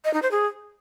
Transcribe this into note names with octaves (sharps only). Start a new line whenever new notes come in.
D#5
D#4
C5
G#4